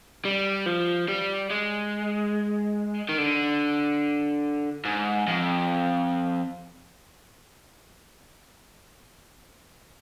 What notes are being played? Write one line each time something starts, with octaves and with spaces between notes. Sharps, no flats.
G3
F3
G3
G#3
D#3
D3
G#2
F2